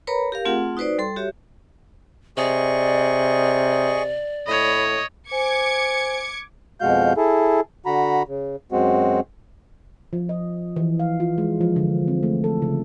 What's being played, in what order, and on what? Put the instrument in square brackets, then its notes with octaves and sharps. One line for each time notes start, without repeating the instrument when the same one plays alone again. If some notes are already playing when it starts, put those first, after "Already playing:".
[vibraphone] A#4 B4 C#5 A#5 B5
G4 A#4 F5
A3 C4 F4 G#4 F#5
D#4 F#4 B4 C5 D5
G3 A4 C6
F#4 G4 C#5 E5
[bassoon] C3 [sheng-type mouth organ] G#4 D#5 C#6 [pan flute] D5
[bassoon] A2 [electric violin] C#5 D#5 [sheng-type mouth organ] B5
[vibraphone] C5 G#5 [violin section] D6 G#6 C#7
[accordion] F2 B2 G#3 F#4 F5 G6
E4 G#4 A4
D3 F#4 A#5 B5
C#3
F#2 G#3 C4 F#4
[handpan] F3
D#5
E3
F5
F4
G#3
F3
D3
C4
A3
A4
C#3